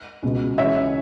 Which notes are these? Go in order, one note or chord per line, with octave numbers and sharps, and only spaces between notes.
C#2 B2 G#3
C#2 C#3 E3 C#5 E5